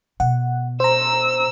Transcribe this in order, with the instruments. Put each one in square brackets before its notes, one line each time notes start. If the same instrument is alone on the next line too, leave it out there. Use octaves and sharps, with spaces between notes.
[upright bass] B2 [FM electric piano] F#5
[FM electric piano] C5 A#5 [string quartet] E6